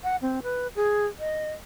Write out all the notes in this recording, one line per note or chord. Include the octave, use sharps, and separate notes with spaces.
F#5
C4
B4
G#4
D#5